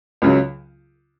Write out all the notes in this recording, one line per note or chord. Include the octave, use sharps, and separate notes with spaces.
C#2 C#3 F#3